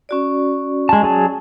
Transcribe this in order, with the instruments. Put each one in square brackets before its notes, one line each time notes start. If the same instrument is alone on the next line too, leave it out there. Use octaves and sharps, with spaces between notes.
[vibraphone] C#4 F#4 D5
[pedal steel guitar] G#3 A5
F#3 G#4 A5